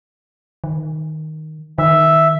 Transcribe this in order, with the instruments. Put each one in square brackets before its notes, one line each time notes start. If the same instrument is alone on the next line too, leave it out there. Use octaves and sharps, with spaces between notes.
[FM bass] D#3
[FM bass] D#3 [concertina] E5